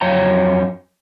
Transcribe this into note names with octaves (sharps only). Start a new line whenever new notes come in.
F2 F#3 C#5 G5 A#5